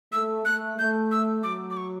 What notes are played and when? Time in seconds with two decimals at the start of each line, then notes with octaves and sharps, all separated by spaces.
0.12 A3 E6
0.45 A3 F#6
0.78 A3 G6
1.12 E6
1.43 F#3 D6
1.70 D6
1.77 C#6